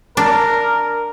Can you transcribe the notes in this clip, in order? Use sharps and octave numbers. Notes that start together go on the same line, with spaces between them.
D4 A#4